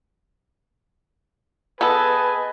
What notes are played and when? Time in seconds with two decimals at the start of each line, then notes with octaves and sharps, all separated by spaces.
1.81 B3 G#4 A4 B4 D#5 G#5